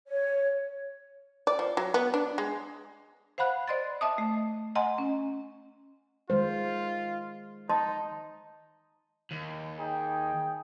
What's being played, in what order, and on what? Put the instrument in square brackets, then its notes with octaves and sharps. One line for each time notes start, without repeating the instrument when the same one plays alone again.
[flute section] C#5
[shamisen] D5
F3
F#3
B3
D4
G#3
[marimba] C5 F5 F#5 B5 F#6
C5 D5 D#5 C6 F#6 A6
D#5 E5 A5 D6 D#6
A3
D#5 F#5 G#5 A#5 C6
C#4
[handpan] D#3 G#3 C5 [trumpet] F4
[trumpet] D#4 [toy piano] D#5 A5 C6
[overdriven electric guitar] D#2
[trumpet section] D#4 G#4 G5